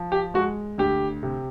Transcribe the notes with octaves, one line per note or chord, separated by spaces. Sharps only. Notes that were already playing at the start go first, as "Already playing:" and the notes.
Already playing: F3
G4
G#3 F#4
D2 G4
C3